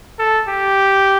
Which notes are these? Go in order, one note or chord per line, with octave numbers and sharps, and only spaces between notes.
A4
G4